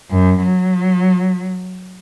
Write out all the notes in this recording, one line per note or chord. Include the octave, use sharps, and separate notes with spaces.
F#2
F#3